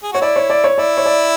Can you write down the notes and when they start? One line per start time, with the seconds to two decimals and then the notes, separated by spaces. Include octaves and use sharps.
0.03 G#4
0.12 F#4 C#5
0.21 E4 D5
0.36 C#5
0.50 D5
0.64 C#5
0.78 E4 D5
0.97 C#5
1.06 D5